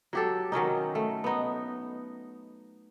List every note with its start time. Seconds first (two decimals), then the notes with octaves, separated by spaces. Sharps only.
0.13 F#3 G4 A4
0.52 D#3 F#3 C#4 D#4
0.95 A3
1.24 B3 D#4